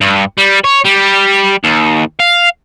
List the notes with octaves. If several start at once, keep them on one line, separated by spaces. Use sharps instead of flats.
G2
G3
C#5
G3
D#2
F5